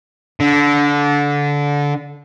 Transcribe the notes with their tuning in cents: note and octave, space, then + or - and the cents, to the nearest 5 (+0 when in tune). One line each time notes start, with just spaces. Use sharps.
D3 -20